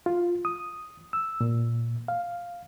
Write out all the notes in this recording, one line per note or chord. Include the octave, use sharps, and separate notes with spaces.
F4
D#6
E6
A#2
F5